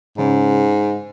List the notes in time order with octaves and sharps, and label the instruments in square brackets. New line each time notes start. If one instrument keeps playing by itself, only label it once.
[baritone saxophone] G#2 [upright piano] C#3